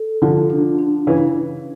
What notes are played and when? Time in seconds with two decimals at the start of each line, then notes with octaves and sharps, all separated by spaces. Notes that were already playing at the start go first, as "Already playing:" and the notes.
Already playing: A4
0.22 D3 F3 F4
0.50 D4
0.78 D4
1.07 C#3 E3